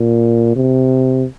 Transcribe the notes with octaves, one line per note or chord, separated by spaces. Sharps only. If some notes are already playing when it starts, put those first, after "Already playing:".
Already playing: A#2
C3